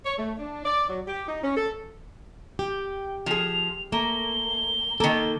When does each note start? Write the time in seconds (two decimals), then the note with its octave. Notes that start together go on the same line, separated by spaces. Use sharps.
0.05 C#5
0.18 A3
0.38 D4
0.65 D5
0.89 F#3
1.07 G4
1.28 D#4
1.44 C#4
1.57 A4
2.59 G4 G5
3.26 F3 G#4 F7
3.92 A3 A#3 G7
5.00 D#3 A#3 A4